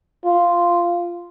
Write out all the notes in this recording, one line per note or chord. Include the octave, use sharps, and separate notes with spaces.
F4